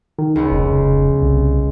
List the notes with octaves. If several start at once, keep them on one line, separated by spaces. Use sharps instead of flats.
D#3
C#2 B3
F1
C2